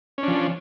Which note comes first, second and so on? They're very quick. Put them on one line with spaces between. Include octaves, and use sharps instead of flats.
C#4 D4 F3